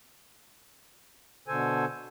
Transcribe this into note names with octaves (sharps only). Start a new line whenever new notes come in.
B2 D3 A4 C5 G#5